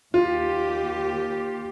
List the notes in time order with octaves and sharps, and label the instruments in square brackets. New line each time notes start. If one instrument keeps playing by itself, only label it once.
[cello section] D#2 G4 [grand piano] F4